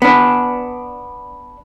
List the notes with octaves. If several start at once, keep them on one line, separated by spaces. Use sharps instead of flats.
B3 D4